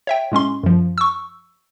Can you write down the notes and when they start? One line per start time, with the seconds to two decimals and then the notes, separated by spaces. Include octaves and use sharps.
0.07 C#5 E5 G5
0.32 A2 G#3 C#4 C6
0.63 F#2 F3
0.98 C#6 E6